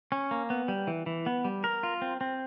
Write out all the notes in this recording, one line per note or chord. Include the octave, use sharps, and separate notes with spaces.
C#4
A#3
B3
G3
E3
E3
B3
G3
A#4
F4
C4
C4